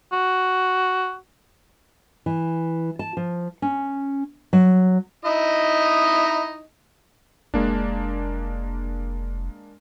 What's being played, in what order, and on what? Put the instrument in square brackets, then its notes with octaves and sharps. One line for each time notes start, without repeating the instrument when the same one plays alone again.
[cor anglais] F#4
[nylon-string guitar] E3
A5
F3
C#4
F#3
[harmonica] D#4 E4 D#5
[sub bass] F1 [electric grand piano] G#3 A#3 D4